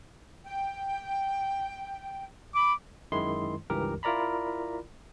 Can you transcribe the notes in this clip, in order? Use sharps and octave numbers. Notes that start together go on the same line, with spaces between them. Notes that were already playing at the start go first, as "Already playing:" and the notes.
G5
B5 D6
F#2 D#3 G#3 E4 C6
C#2 G2 E3 G4 A#4
E4 F4 A#4 D5 A#5 B5